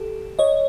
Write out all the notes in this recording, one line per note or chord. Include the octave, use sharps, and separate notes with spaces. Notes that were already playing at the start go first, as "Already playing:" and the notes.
Already playing: G4 A4
C#5 D#5